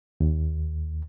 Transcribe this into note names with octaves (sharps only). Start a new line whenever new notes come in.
D#2